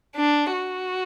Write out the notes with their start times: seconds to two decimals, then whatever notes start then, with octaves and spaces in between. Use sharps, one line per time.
0.16 D4
0.53 F#4